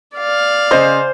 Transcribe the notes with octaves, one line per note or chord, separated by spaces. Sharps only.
D5 F5
C#3 C5 D#5